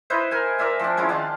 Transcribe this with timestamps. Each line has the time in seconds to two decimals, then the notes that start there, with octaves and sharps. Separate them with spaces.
0.10 D#4 E4 B4 C5
0.31 A#4 G#5
0.59 A#4 D5 E5 G#5
0.79 F3 C4 D4
0.97 G#3 C#4 E4 F4
1.09 D#3 D4 F4 A5